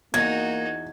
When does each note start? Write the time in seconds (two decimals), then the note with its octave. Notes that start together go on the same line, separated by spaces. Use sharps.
0.14 E2 A#3 D#4 F#4 G#6